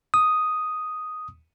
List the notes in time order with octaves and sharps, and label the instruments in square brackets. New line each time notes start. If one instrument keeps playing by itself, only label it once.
[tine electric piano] D#6